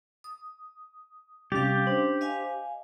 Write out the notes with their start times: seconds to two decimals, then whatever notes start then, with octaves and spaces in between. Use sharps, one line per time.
0.24 D#6
1.52 C3 G3 C#4 G4 F5 A6
1.87 D4 C5
2.21 D#5 F5 G#5